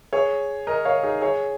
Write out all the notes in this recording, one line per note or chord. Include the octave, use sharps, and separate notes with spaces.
G#4 C#5
A#4 D#5
C#5 F5
D#4 G#4
G#4 C#5